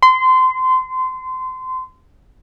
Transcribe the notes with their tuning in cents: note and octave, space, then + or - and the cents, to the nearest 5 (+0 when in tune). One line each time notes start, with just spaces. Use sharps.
C6 -25